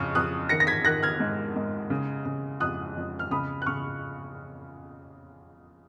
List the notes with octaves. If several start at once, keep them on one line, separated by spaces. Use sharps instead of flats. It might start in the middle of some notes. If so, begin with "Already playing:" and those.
Already playing: F2 C#3 C#6 F6
F2 D#6 F#6
D#3 A#6 C#7
A#6
G#6 B6
D#3 F#6 A#6
F6 G#6
G#2
G#2
C#3
C#3
F2 D#6 F#6
F2
F6
C#3 B5 D#6
F#6
C#3 C#6 F6